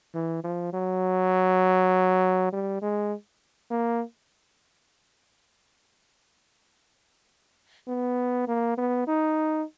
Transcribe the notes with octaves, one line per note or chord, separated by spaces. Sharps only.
E3
F3
F#3
G3
G#3
A#3
B3
A#3
B3
D#4